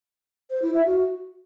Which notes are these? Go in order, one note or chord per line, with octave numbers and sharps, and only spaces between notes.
C5
E4
E5
F#4